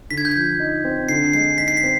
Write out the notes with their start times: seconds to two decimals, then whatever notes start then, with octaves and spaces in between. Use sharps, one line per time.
0.11 D3 B6
0.18 G#6
0.25 G6
0.31 F3 G#6
0.60 D#4
0.84 C4
1.09 D3 C7
1.33 G#3 C7
1.58 D#4 B6
1.68 C7
1.77 B6
1.83 C4